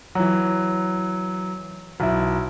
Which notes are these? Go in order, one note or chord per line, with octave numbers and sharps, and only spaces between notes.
E3 F#3
B1 E4